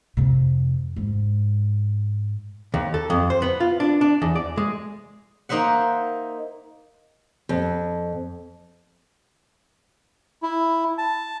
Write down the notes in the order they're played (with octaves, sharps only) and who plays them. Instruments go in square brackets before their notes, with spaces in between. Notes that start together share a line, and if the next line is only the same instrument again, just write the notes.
[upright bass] F2 C3
G#2
[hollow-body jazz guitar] D#2
A4
F2
C5
B3
F4
D4
D4
E2
D5
G#3
[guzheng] A#3 D#4 C5 E5 F#5
[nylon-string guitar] F2
[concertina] E4
A5